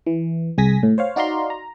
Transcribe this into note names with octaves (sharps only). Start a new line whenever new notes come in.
E3
C2 G#4 G#5 A#6 B6
A2
C5 C#5 F5
D#4 F#4 D5 F5 A#5 C6
A#5